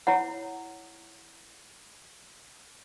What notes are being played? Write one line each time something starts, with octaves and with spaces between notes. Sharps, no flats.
E4 C#5 F#5